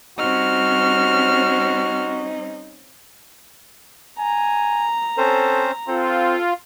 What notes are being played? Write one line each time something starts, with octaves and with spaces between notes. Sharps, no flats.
G3 C4 C#4 D#4 F#4 F6
G#5 A#5
C4 C#4 A4 C5
C4 F4 A4